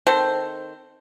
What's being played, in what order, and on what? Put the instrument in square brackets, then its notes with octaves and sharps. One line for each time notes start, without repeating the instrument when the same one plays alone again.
[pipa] D#3 C4 A4 C5